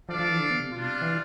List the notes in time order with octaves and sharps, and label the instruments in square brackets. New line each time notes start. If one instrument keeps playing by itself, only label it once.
[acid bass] F3 [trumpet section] D4 A4 D5 F5
[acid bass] F3
E3
D3
B3
C3
[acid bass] B2 [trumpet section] G3 D4 F4
[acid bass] C3
E3